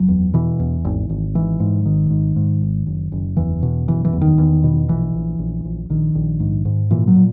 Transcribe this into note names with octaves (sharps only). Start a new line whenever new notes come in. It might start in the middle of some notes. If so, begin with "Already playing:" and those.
Already playing: F#1 F#3
E2
B2 E3
E2
G#1
G#1
G#2 E3
G#2
G#1 D#3
G#2
G#2
G#1
F#1
F#1
E2 E3
B2
F#1 E3
E3
E2
D#3
E2
B2
A#1 E3
A#1
A#1
A#1
A#1 D#3
A#1
G#2
G#2
A#2 E3
F#3
A#2